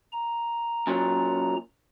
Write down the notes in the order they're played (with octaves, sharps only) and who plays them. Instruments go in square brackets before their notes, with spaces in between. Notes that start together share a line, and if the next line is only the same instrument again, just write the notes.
[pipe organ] A#5
[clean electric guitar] F#2 A#2 F#3